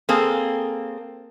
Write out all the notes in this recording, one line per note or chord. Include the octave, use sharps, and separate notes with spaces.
A#3 C4 G#4 A4